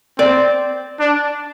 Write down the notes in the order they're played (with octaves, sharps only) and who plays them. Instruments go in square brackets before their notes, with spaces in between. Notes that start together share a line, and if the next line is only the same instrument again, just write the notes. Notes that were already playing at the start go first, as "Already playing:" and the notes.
[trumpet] C4 [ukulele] D5
[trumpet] D4